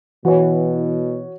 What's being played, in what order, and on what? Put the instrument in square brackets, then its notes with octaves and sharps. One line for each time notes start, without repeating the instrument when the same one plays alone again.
[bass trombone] B2 [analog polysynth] E3 [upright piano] F#4 C#5